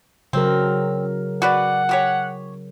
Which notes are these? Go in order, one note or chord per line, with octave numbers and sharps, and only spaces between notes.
C#3 F#3 C4 A#4
F#4 B4 D5 F#5
F#4 G4 C#5